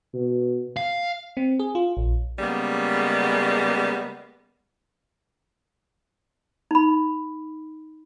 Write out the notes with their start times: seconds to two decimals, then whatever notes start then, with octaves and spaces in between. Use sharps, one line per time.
0.14 B2
0.77 F5
1.37 C4
1.59 G#4
1.75 F4
1.97 A#1
2.39 C#3 G3 G#3 A#3 B3
6.71 D#4 B5